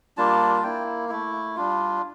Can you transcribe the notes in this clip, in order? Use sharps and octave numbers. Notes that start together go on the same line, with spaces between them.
G3 A#3 D4 F4 A5
A5
A#3 E4 G5
A3 E4
G3 D4 F4